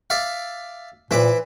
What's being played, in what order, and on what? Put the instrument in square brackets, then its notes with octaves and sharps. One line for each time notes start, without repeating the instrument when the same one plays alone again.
[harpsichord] D5 E5 F5
[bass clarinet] A#2 [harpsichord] E3 E5 D6 [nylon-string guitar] B4 C5